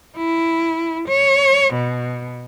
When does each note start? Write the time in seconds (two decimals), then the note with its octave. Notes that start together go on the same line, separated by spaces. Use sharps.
0.17 E4
1.08 C#5
1.74 B2